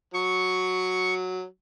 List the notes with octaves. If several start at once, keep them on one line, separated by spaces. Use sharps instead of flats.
F#3 C#6